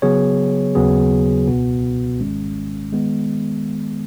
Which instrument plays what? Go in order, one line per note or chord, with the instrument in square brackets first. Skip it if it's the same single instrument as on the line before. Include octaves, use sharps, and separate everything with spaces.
[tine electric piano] C#3 F#3 B3 G#4 C#5
D#2 C#3 F#3 B3 G#4
C#2 B2 B3 F#4
G#1 G#2 D#3 G#3 C#4
D#3 G#3 B3